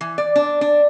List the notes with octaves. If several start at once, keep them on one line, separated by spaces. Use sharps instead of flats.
E3
D5
D4
D4